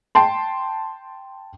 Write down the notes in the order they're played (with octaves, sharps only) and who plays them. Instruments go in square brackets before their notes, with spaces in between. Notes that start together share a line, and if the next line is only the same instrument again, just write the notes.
[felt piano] G5 A5 C6